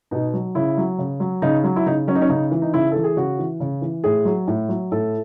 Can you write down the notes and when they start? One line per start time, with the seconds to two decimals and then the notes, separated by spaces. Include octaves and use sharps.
0.11 B2 D#4
0.33 F#3
0.55 C#3 E4
0.78 F#3
0.98 C#3
1.20 F#3
1.42 C#3 D#4
1.64 F#3
1.76 E4
1.86 C#3 D#4
2.07 F#3 C#4
2.15 D#4
2.21 C#4
2.29 C#3 D#4
2.51 E3
2.62 D#4
2.74 C#3 E4
2.91 E3 A4
3.04 G#4
3.17 C#3 F#4
3.39 E3
3.60 C#3
3.82 E3
4.04 A2 G#4
4.25 F#3
4.48 A2
4.69 F#3
4.92 A2 A4